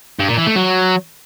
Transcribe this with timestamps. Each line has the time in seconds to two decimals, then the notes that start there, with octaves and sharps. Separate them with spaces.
0.19 G2
0.28 A#2
0.37 E3
0.47 A3
0.56 F#3